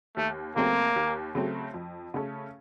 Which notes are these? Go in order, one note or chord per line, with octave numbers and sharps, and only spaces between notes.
D#2 A3
C#3 F#3 A3 A#3 C4
D#2
C#3 F#3 A3 C4
F2
C#3 A3 C#4 A4